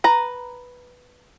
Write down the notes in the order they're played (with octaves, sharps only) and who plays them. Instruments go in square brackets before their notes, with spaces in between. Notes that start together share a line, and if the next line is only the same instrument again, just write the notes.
[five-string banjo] B4 A#5